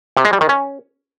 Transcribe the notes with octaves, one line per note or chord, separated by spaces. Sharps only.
C3
G#3
G3
D#3
C#4